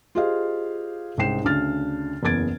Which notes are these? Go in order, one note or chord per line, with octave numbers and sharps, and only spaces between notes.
F4 G4 G#4 C5 D#5 F5
C2 G#2 C#4 G5 C7 E7
D2 C#3 D4 F6 A6
F#1 E2 B3 G#6 A6 D7